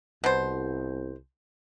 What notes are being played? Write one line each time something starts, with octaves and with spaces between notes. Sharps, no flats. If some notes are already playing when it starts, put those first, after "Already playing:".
C2 B2 C5